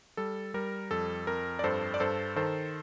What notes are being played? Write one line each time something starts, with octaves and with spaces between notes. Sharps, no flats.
G3 A4
G3 A#4
F2 A4
F2 A#4
D5
G2 A4 C5
D5
G2 A4 C5
D#3 A4 C5